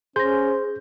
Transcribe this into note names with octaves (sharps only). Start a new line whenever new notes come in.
C#4 G#4 C5 C6 G6 A#6